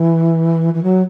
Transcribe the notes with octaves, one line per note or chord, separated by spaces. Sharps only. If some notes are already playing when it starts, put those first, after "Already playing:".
Already playing: E3
E3
F#3